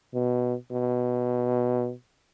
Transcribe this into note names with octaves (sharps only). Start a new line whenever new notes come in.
B2
B2